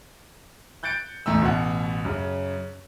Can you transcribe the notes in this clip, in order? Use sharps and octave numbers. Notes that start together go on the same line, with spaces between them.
F#6 G6 A6 C#7 D7
A1 E2 A3 A#5 E6
A1 B2 F#5
F#2 C#3